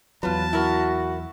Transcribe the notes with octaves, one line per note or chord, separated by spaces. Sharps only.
E2 F#3 F4 B4 A5
E4 F#4 A#4